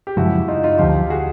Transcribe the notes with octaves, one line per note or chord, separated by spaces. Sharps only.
G4
F#2 C#3 F3 G#3 E4 F#4
D#4 F4
D#4 F4
D2 D3 F3 F4 G4
F#4 G#4